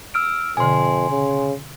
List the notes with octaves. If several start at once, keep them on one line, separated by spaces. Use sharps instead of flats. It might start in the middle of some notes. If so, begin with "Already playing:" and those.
E6 F6 D7
F2 B2 D3 G#5 C6
C#3